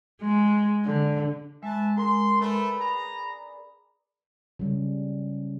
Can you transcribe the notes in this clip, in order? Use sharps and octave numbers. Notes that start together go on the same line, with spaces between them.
G#3
D3
G#3 B4 E5 A5
G#4 A#4 C6
A3 B4 D5
G#4 A#5 B5
C#3 G3